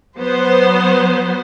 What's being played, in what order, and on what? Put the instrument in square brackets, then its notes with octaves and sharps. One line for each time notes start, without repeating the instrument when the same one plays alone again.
[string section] F#3 B3 C5